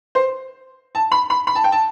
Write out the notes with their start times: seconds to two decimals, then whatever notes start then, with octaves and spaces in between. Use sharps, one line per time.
0.15 C5
0.95 A5
1.12 B5
1.30 B5
1.47 B5
1.55 A5
1.64 G5
1.72 A5